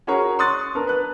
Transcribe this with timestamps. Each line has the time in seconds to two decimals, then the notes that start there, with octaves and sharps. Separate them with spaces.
0.07 C#4 F#4 G#4 A#4 C#5 A#5
0.39 C6 C#6 D#6 F#6 A6
0.75 B3 D4 A#4
0.87 B4 F#6